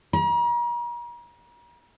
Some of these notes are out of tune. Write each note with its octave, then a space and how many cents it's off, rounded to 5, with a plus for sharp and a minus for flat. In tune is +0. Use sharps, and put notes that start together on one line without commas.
A#5 +40